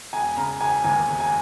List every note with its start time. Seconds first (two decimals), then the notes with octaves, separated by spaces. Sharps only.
0.13 E1 G#5
0.36 C#3 A#5
0.60 E1 G#5
0.84 D#2 G#5
1.08 E1
1.20 G#5